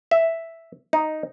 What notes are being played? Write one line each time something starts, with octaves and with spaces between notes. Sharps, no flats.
E5
D#4